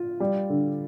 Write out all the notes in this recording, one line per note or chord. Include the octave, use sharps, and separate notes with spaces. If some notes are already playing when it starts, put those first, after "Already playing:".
Already playing: F4
G3
D3